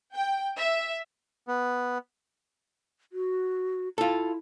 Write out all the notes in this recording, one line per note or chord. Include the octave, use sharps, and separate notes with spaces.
G5
E5
B3
F#4
E4 F4 A4